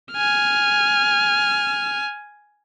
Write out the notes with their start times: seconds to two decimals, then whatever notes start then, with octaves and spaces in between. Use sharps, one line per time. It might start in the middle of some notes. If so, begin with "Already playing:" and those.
0.12 G#5 F6